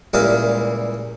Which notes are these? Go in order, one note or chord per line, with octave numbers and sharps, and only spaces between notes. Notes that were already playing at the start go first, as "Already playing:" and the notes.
C#2 A#2 G3 E4 F5